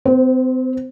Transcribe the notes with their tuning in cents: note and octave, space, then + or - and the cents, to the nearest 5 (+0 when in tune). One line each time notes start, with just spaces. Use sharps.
C4 -35 C5 +0